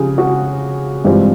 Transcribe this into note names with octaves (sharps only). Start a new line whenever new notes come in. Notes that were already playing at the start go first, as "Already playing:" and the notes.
Already playing: C#3 F3 G4 G#4
F#4
G2 E3 G#3 C4 F4 G4